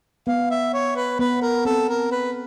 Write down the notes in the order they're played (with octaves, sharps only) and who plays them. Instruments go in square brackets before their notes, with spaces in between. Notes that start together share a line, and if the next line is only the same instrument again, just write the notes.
[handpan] B3 [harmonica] F5
[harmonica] E5
C#5
B4
[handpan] B3 [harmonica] B4
[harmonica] A#4
[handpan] C4 [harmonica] A4
[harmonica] A#4
B4